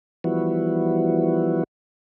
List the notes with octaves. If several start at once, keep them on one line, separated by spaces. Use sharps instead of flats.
E3 F3 G3 B3 E4 F#4